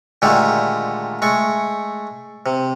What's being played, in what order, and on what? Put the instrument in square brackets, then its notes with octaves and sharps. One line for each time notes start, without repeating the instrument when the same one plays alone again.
[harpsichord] A#2 D3 D#3 G#3 A3 G4
G#3 A3 C#6
C3